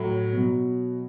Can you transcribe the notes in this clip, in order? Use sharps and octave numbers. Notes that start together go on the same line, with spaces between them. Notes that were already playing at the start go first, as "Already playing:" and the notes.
Already playing: A2 F#3
B2
F#3